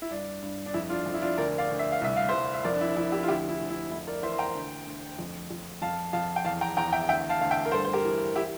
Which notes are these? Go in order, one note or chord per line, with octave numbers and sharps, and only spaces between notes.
E4
G2 D4
G2
D4
F2 E4
D4 F4
F2
E4
D4 F4
D2 A#4 D5
D5 F5
D2
E5
F5
C2 E5
F5
C2 C5 E5
E5
F2 A#4 D5
D4
E4
F2 E4
E4 G4
F4
D2 E4 G4
E4
D2
E4
F2 E4
A#4 D5
E3 C5 E5
C6
G5 A#5
D2
D2
F2
F2
F2 F5 A5
F2 F5 A5
G5
E2 F5 A5
G5 A#5
E2 G5 A#5
E5 G5
D2 E5 G5
F5 A5
D2 F5
E5 G5
A#4
G2 A4 C5
C5
G4 A#4
E3
E4 G4